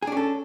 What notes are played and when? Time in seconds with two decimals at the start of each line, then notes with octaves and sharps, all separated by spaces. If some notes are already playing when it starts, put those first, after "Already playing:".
0.02 G#4
0.07 D4
0.12 C#4
0.17 A4